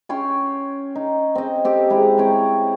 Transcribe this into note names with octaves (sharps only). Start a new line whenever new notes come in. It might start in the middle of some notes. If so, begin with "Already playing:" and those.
C#4 C#5 G5 C6
D#4
C4 D#5
C4 G4 A4
G#3 E4 A#5
C4 C#5 G5 A#5